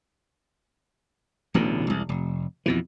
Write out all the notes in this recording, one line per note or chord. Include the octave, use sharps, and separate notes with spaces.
D1 A1 B2 D3
E1 C2
F1
F2 B2 E3